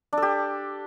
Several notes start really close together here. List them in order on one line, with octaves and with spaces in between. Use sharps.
D4 A4 G4